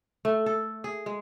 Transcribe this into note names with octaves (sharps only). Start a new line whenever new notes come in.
A3
A4
G#4
G#3